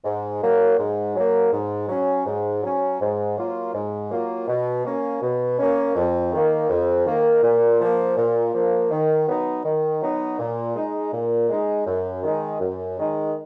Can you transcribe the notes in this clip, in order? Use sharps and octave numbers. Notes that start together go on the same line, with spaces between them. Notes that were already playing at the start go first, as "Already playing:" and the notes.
G#2
F#3 A#3
G#2
F#3 A#3
G#2
F#3 C#4
G#2
F#3 C#4
G#2
F#3 A#3 F4
G#2
F#3 A#3 F4
B2
A#3 C#4
B2
A#3 C#4
F2
D#3 A#3
F2
D#3 A#3
A#2
F3 A#3
A#2
F3 A#3
D#3
F#3 B3 D#4
D#3
F#3 B3 D#4
A#2
G#3 D#4
A#2
G#3 D#4
F#2
D#3 G#3 D#4
F#2
D#3 G#3 D#4